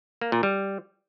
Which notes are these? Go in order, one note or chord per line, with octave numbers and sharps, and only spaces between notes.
A#3
A#2
G3